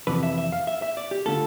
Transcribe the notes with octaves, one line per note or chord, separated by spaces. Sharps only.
F2 C3 E3 B4
E5
E5
F5
E5
E5
D5
G4
D3 A3 D4 F4 A4